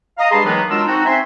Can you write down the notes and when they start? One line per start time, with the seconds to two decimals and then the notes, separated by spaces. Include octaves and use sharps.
0.19 D#5 F5 A#5 D#6
0.31 G2 G#3 G#4 A5 B5 C6
0.45 D#3 E3 F#3 G#3 A#3 B3
0.70 F#3 G#3 D4 F4 A#4 E6
0.87 C4 D#4 F#4
1.06 C4 E5 G#5 C6